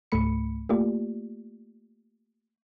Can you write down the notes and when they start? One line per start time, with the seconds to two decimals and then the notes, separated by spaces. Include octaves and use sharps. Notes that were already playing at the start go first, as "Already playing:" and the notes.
0.12 C#2 G#2 A3 B5 C#7
0.69 A3 A#3 F4 G4 D5